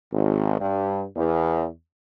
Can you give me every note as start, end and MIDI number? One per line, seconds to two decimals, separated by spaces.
0.13 0.58 32
0.60 1.04 43
1.16 1.68 40